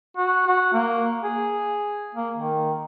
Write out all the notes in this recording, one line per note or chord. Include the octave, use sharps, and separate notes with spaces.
F#4
F#4
A#3
G#4
A#3
D#3